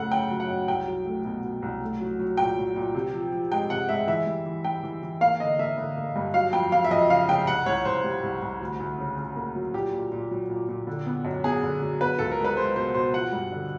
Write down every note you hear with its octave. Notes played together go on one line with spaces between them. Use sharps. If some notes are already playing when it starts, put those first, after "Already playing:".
Already playing: F#2 C#3 A3 F#5
C#3 G5
F#3
F#5
F#2
C2 G5
F#3
A3
B2
B2
C2
A3
F#3
F#3
A#2 G5
F#3
A#2
C3
F3
F3
G#3 G5
C3 F#5
G#3 E5
E3 E5
G3
E3
G3 G5
E3
E3
A#3 F5
D3 D#5
A#3 E5
D3
A#3
G2
F#3 F5
F2 G5
F2 F5
E5
F2 D#5
C#3 F5
C#3 G5
C2 F#5
C2 C#5
C2 C5
G3
C2
C2
D2
D2
C#3
C#3
A#3
F#3
A#2 G4
A#2
A#2
F#3
A#2
A#2
D3
B3
F#2
B3 G#4
D3
F#3
B3 B4
C#2 A4
A#4
G#3
B4
G#3 C5
B2 C5
B2 C5
F3 F#5
G2
D3